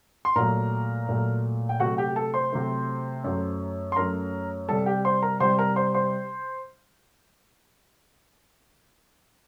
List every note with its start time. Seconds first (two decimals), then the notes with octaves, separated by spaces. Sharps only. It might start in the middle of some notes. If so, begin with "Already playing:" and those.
0.25 C6
0.36 A#2 F#3 A3 A#4 A#5
1.09 A#2 F#3 A3
1.69 G5
1.80 C3 F#3 A3 F#4 F#5
1.98 G4 G5
2.16 A4 A5
2.34 C5 C6
2.52 C3 F#3 A3
3.24 F#2 F#3 A3
3.92 C6
3.96 F#2 F#3 A3 A#4 A#5
4.69 C3 G3 A4 A5
4.86 G4 G5
5.05 C5 C6
5.22 A#4 A#5
5.40 C3 G3 C5 C6
5.59 A#4 A#5
5.76 C5 C6
5.94 C5 C6